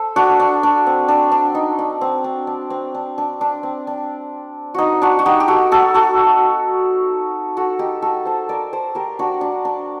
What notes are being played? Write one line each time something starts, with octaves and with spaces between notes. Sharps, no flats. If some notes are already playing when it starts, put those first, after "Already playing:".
Already playing: A4 C5
D4 F#4
D4
D4
C4
D4
D4
D#4
D4
C4
D4
D4
C4
D4
D4
D4
C4
D4
D#4 F#4
D4 F#4
F#4
D#4 G4
G4
F#4 A4
F#4 A4
F#4 A4
F#4 A4
D#4 G4
F#4 A4
A4 C5
A#4 D5
A4 C5
G4 A#4
D4 F#4
D4
D4